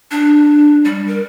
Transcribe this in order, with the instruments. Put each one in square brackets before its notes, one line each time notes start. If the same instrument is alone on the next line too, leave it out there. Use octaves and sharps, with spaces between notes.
[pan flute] D4
G3
A#4